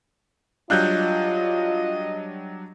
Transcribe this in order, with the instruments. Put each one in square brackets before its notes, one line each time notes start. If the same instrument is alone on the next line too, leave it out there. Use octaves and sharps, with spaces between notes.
[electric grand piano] F#3 G3 D4 [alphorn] F4 [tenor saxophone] D#5 [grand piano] F5 F#6 G6